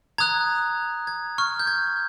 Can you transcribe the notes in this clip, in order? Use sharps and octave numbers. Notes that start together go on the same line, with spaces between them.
A#5 D#6 F#6 G#6
G#6
C#6 F6
G6
G#6